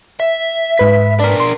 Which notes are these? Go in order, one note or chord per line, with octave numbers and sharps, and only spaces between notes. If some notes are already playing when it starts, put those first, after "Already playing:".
E5
G#2 B4 B6
D4 A#4
C6